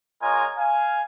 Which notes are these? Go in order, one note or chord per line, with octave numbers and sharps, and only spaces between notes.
G#3 F4 A#4 C#5 D#5 G#5
F5 G#5